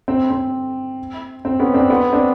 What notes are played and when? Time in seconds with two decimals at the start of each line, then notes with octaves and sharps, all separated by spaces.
0.08 C4
0.30 C4
1.45 C4
1.60 B3 C#4
1.74 C4 D4
1.90 B3
2.13 C4 D4